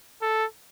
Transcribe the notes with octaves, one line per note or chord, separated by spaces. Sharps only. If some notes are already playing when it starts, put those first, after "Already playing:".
A4